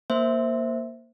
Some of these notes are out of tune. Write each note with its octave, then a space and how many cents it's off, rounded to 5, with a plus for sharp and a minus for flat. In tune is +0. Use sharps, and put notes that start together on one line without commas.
A#3 +0 C5 +0 E5 +0